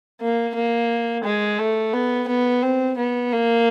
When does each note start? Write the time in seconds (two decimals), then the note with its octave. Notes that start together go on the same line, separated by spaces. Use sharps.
0.21 A#3
0.55 A#3
1.25 G#3
1.59 A3
1.94 B3
2.28 B3
2.63 C4
2.98 B3
3.32 A#3